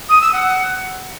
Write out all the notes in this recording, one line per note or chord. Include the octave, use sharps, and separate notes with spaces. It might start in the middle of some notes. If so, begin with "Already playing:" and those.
D#6
E6
F#5